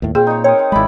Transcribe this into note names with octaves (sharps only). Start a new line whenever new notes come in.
D#2 A2
A#2 C4 G#4
D#4 C#5
C4 A#4 C#5 D#5
C4
G#1 G#3 E4 D5 B5